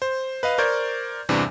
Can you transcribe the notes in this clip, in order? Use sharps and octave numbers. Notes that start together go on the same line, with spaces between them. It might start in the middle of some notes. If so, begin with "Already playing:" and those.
C5
B4 D#5 F5
A#4 C5 D5 C#6 G6 G#6
E2 G2 C3 E3 D4